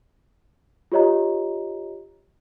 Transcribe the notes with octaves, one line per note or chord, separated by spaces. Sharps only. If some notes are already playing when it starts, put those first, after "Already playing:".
F4 G4 C#5 D#5 A#5